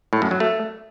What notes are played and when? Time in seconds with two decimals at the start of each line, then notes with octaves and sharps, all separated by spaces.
0.13 A2
0.22 F#2
0.31 F#3
0.40 A3